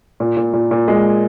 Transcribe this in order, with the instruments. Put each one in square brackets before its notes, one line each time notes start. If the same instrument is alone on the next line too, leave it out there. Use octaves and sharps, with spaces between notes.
[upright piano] A#2
A#2
A#2
A#2
G#3